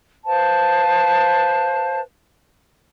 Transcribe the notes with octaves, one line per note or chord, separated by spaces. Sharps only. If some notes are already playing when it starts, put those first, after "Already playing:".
B4 C5 F5 A5